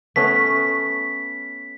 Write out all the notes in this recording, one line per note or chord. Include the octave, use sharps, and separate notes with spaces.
A3 B3 C#4 B6